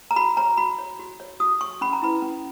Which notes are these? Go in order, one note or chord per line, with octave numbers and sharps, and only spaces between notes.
A#5
F#4 B5
C#5 A#5
F#4 B5
C#5
F#4
C#5
F#4 D#6
C#5 C#6
C#4 B5
A#5
E4 B4 B5
C#4